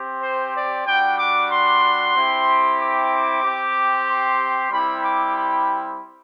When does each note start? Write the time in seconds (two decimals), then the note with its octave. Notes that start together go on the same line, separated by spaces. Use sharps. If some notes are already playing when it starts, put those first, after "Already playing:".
Already playing: C4 G4
0.21 C5
0.55 D5
0.86 G3 D4 F#4 G5
1.18 D6
1.50 C6
2.14 C4 E4 G4
2.79 D6
3.43 C4 G4
4.07 C6
4.71 G3 C4 E4 G4 B5
5.03 D6
5.35 B5